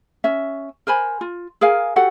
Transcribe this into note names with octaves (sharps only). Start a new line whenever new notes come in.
C#4 E5
A#4 C5 G#5 B5
F4
G#4 A#4 F5 G#5
F#4 G4 A4 F#5